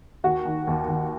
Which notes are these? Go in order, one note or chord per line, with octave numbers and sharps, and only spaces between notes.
D#2 F#4
D#3
D#2
D#2